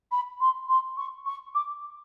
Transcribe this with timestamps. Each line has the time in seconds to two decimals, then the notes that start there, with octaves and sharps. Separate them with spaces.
0.12 B5
0.41 C6
0.69 C6
0.97 C#6
1.26 C#6
1.55 D6